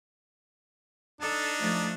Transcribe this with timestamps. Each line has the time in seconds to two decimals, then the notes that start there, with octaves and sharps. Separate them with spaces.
1.21 D4 D#4 A4
1.59 F3 A3